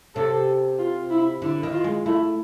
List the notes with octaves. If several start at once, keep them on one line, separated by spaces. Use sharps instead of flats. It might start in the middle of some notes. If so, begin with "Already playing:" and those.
C3 A4
F4
E4
D3 E4
D#3
F4
G#3
A3 E4